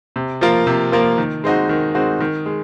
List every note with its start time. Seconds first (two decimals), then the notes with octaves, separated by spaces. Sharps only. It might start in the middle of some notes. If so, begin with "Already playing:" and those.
0.16 C3
0.41 F3 A#3 F4 A#4
0.67 C3
0.92 F3 A#3 F4 A#4
1.18 D#3
1.44 G#3 C4 D#4 F#4
1.69 D#3
1.95 G#3 C4 D#4 F#4
2.20 D#3
2.46 G#3